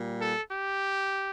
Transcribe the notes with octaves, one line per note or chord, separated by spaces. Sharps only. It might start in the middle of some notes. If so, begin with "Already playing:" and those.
Already playing: A#2 G3
A4
G4